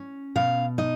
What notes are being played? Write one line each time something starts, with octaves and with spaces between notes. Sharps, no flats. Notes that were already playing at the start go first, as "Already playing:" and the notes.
Already playing: C#4
B2 F5
D#4 D#5